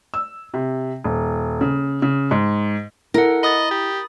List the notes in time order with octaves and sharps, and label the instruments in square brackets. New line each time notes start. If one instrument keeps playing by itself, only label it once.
[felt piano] E6
C3
D#1
C#3
C#3
G#2
[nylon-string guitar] E4 [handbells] A4 F#5 [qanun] A#4
[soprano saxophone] D#5 [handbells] B5 D#6 A6
[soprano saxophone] G4